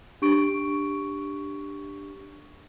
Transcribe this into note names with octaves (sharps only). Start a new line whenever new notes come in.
D4 G4 C#6 D7